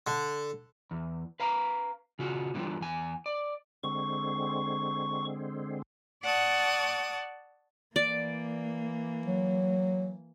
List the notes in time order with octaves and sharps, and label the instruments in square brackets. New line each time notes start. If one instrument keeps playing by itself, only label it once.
[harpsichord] D3
[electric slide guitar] E2
B4 F5 A#5
C#3 F4 F#4
A2 D3 E3 G3 F4
E2 G#5
D5
[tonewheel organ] D3 G#3 C4 [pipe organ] C#6
[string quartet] D5 F#5 A5 C#6 D#6
[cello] E3 A#3 [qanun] D5
[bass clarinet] F#3